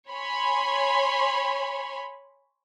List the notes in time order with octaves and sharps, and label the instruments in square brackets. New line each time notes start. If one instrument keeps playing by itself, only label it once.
[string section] C#5 G#5 B5 C6